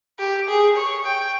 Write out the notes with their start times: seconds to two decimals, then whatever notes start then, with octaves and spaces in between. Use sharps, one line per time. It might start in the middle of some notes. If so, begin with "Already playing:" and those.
0.19 G4
0.48 G#4
0.76 C#5
1.05 G5